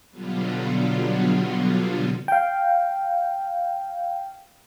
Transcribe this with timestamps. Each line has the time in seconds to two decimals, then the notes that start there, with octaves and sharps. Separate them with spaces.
0.11 B2 D3 F#3 G3 B3 F4
2.28 F5 G5